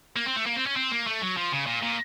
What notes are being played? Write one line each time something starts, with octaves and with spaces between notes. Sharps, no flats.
A#3
C4
A3
A#3
C4
C#4
C4
A#3
A3
F#3
F3
C#3
A#2
A#2